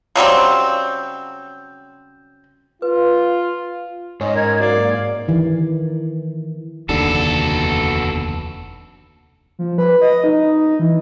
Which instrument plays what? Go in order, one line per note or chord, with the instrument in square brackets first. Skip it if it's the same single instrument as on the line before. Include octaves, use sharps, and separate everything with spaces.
[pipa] C#3 F#3 G3 C4
[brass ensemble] F4 [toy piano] B4
[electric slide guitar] G#2 [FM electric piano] C#4 [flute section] D#5
[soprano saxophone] A#4 [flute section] G#6
[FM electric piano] F#3 A#3 [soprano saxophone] D5 [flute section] F5
[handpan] D#3 E3
[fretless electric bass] F1 D#2 D3 [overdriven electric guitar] B2 A4
[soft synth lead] F3
B4
D#5
D#4
E3